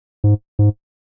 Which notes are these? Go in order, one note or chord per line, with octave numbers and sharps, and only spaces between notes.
G#2
G#2